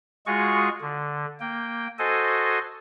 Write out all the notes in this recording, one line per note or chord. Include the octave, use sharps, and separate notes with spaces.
G#3 F4 F#4 G#4 C#6
D3
A#3 G5
F#4 A4 C5 D#5 G#5